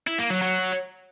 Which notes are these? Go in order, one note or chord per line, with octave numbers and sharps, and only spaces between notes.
E4
A#3
F#3
F#3